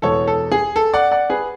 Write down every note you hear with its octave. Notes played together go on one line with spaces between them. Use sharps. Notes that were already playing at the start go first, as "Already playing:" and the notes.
E2 B2 G#3 A4 C#5
A4
G#4
A4
D5 F#5
D5 F#5
G#4 B4